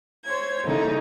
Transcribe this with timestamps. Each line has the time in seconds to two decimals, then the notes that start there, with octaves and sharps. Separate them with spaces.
0.24 C5 C#5 G#6
0.65 C#3 G3 A#3 D#4 E4 A4